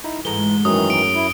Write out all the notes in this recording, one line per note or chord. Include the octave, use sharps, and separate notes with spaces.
D#4 E4
G#2 E3 G#3 A3 A#5 G7
F#2 D#3 E3 F#3 D#6
D7
E4